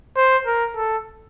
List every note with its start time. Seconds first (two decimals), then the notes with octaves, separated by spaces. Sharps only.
0.17 C5
0.46 A#4
0.76 A4